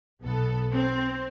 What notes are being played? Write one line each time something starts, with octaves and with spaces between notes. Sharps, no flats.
B1 B3 A4
C4